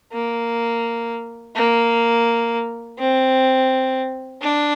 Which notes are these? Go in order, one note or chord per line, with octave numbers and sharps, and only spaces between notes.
A#3
A#3
C4
D4